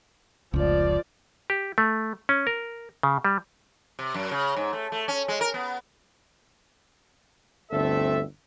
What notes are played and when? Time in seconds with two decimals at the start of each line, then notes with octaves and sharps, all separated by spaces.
0.54 F1 C#2 F3 D5
1.50 G4
1.78 A3
2.29 C#4
2.47 A#4
3.03 C#3
3.25 G3
3.99 C3
4.14 F#2
4.31 C#3
4.57 G#2
4.73 A3
4.92 A3
5.08 C#4
5.28 G#3
5.41 A#4
5.54 B3
7.72 G1 D2 A3 C4 A4 E5